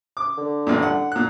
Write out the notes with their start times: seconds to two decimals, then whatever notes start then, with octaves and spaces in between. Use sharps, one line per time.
0.17 D6
0.37 D3
0.67 A1 G2 A#2
0.82 F#5
1.12 A#2 F#6